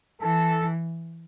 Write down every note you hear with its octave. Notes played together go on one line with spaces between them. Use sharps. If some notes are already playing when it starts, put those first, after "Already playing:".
E3 A4